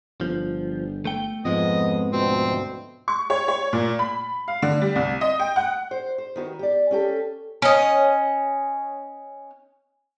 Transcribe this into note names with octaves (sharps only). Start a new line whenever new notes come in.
G1 F3
A3 G5
F2 G#2 F3 G#3 B3 D#5
D2 B2 C4
C#6
C#5
C#5
A#2
B5
F5
D3
G3
C2
D#5
G5
F#5
C5
C5
D#3 B3 F#4
G4 D5
C#4 G4 A4
C#4 D#5